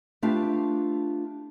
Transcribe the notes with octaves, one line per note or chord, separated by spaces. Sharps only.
A3 D4 F4 G4 B4 A5